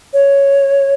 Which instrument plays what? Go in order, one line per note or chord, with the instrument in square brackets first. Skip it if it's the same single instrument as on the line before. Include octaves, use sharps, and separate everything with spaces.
[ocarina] C#5